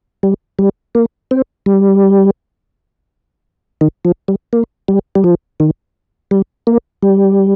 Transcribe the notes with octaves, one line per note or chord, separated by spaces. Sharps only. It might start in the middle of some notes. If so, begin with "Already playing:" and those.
G3
G3
A#3
C4
G3
D#3
F3
G3
A#3
G3
G3
F3
D#3
G3
A#3
G3